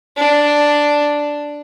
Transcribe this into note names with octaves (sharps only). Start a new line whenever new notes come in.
D4